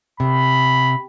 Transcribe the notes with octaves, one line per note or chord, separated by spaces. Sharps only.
C3 B5